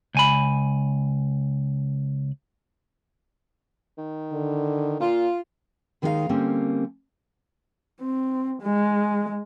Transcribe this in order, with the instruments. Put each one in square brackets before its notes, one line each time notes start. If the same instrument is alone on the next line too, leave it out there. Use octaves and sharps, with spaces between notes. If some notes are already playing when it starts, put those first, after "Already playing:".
[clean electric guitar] C#2 G#5 B5
[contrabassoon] D#3
[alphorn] D3
[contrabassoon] A#2 [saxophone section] F4
[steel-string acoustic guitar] D#2 D#3 G#3 D#4 A#4 F5
D3 G3 A#3 C4 C#4
[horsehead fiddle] C4
G#3